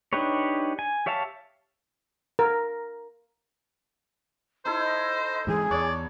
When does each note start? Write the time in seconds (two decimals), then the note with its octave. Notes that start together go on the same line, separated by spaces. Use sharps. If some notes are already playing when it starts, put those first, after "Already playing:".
0.13 D4 D#4 G4 B4 C#5
0.79 G#5
1.06 G4 C#5 E5 F5 A5
2.39 A#4
4.65 D#4 E4 A4 C5
4.80 D#5
5.47 G#2 E3 G#4
5.71 E2 C#5 D5